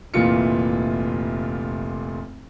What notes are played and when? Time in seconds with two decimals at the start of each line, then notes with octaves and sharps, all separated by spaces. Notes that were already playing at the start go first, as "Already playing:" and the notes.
0.14 F1 A#2 E3 F4 C#7